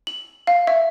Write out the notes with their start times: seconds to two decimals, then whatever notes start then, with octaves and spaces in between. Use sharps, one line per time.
0.07 F#7
0.47 F5
0.67 E5